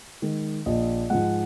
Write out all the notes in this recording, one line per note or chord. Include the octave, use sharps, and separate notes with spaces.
D#3 G#3
A#1 D#5
G#2 F3 G#3 F#5